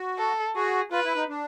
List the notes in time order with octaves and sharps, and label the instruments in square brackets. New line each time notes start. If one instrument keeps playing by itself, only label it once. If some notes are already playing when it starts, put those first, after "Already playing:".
Already playing: [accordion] F#4
[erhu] A4
[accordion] F#4 [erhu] G#4
[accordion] F4 [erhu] B4
[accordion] E4
D#4
D4